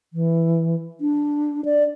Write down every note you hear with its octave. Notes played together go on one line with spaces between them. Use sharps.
E3
D4
D5